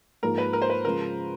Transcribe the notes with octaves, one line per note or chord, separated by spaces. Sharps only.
G#2 F3 A#3 A#4
B4
A#4
C5
B4
C#3 F3 G#3 A#4